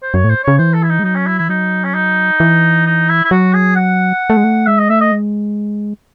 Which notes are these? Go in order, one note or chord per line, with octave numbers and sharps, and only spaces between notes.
C5
F#2 C#5
A2 C5
C#3 C#5
E3 C5
A4
E4
D#4
G#3
F#3 D#4
C#4
E4
E3 E4
F#3 D#4
C#4
D#4
E3
D#4
E4
E4
F#3 F#4
G#4
F#5
A3
G#3
A3
G#3 E5
D#5
A3 E5
D#5
G#3